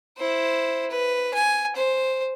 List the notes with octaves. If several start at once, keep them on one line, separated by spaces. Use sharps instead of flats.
E4 C5
B4
G#5
C5